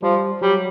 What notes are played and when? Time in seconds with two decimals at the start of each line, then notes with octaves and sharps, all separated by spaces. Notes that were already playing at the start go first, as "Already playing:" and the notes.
0.03 F3 G3
0.42 F#3 G3